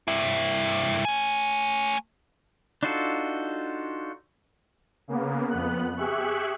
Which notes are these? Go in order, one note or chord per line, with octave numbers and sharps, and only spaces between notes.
G2 E4
A3 G#5
D4 D#4 F4 F#4 A4
C#3 A#3 B3
F2 B3 F#6
G4 G#4 E5 C#6 F#6